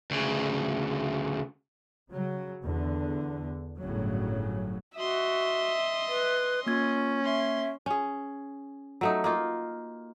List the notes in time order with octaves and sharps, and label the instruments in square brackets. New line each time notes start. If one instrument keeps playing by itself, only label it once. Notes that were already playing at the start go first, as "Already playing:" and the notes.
[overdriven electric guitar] D2 C#3
[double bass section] C#3 F#3
E2 D3
G1 A2 C#3 F#3
[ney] F#4 [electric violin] D#5 C6 [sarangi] E5
[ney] B4
[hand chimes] A#3 G#6 [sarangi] C#4 [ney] F4
[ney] E5 [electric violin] C6
[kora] C#4 G#4
F#3 A3 D#4
A#3 D#4 F4